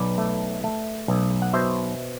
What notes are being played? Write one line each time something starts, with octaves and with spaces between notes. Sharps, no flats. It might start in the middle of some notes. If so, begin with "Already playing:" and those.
Already playing: B1 B4 D5
A3
A3
B1
F#5
B2 C5 E5